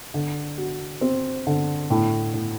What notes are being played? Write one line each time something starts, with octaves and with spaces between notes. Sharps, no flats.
D3
F#4
C4
D3
A2
A2